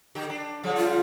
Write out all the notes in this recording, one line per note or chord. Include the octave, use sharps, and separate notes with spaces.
D3 G4
D4
C#3 F3 G3
F4